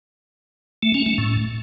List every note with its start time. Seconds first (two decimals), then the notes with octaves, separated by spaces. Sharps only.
0.83 A3
0.94 C#4
1.06 A3
1.18 A2